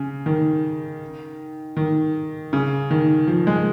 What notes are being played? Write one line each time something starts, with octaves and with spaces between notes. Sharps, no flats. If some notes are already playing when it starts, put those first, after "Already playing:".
Already playing: C#3
D#3
D#3
C#3
D#3
F3
G#3